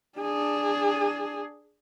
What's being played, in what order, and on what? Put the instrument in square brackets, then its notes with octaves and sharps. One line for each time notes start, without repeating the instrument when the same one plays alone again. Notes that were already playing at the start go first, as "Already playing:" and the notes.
[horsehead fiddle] D4 G#4